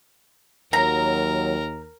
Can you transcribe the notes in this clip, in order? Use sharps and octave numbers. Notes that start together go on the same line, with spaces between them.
D#2 F#3 A#4 A#5